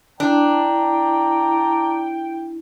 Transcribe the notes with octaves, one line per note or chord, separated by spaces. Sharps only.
D4 E4 D5 G5 A5 A#5